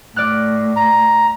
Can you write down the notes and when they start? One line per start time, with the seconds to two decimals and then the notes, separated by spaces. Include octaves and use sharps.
0.16 A2 D5 F6 F#6
0.76 A#5